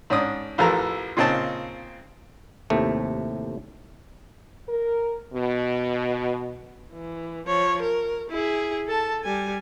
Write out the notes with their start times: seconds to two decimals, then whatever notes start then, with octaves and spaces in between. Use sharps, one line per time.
0.10 G#2 C#4 D4 D#6
0.58 A1 F2 E3 A4 A#4 A#5
1.17 A#2 C#3 C4 D#4 A5
2.70 D#2 A2 C3 A3
4.69 A#4
5.34 B2
6.93 E3
7.46 F3 C#5
7.82 A#4
8.30 E4 G#4
8.87 A4 A5
9.24 G3 G#5